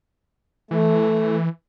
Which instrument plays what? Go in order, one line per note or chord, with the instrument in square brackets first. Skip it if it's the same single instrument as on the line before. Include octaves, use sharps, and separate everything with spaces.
[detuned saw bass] E3 [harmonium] A3